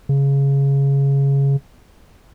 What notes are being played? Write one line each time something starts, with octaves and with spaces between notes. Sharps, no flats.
C#3